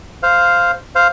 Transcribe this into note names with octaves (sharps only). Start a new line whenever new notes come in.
C5 F5
C5 F5